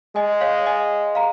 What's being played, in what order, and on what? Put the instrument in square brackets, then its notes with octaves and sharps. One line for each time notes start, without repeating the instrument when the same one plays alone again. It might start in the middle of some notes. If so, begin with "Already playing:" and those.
[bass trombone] G#3 [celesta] D#5 G#5
[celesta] C#5 F5
D#5 G#5
F5 A#5